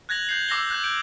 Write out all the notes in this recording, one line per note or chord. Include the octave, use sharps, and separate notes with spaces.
F#6 G#6 A#6 F7 F#7
G6 G#6 C7 F7 F#7
D6 E6 A#6 C7 G7
F#6 G6 F#7
G6 D7